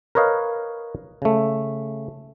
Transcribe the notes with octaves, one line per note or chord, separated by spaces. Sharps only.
A#4 B4 C#5 D#5 F5
C#3 A3